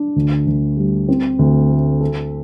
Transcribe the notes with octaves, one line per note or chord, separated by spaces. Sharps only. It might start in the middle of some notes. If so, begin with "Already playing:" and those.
Already playing: D4
D2
D2
G3
C4
D2
A3
A4